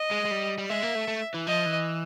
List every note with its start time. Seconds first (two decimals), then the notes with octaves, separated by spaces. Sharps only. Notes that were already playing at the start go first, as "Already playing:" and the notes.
Already playing: D#5
0.11 G#3
0.25 G#3
0.31 G3
0.58 G3
0.69 G#3 E5
0.83 A#3
0.95 A3
1.08 A3
1.34 E3
1.47 F3 D#5
1.66 E3